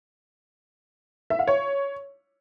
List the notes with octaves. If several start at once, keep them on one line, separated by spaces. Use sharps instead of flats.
E5
F5
C#5